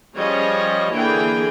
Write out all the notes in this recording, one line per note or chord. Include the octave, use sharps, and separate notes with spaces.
F3 G3 C#4 G#4 C#5 D#5
D3 E3 A#3 G#4 G5